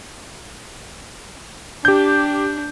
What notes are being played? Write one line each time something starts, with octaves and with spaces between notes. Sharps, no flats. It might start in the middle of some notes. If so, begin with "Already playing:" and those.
D4 G4 G6